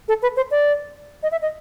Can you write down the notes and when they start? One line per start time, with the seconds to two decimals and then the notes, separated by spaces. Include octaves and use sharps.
0.08 A4
0.22 B4
0.36 C5
0.51 D5
1.23 D#5
1.31 E5
1.41 D#5